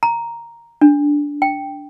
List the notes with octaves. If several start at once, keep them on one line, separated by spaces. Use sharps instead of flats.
A#5
D4
G5